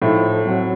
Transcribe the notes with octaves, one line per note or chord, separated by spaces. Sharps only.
A2 F3 A3 D#4
F#3 C4 F#4